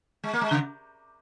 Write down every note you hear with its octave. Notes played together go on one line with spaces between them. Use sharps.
G#3
A#3
G#3
C#3